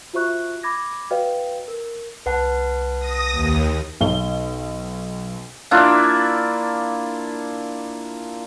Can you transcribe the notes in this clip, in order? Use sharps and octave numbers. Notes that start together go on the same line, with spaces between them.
F4 F#4 C5 E5 C#6 F#6
B5 D6 G#6 A#6
F#4 B4 C#5 D#5 F5 G5
A#4
C2 B4 F#5 A5
D#6 A#6
D#2
B1 G7
A#3 D4 E4 F4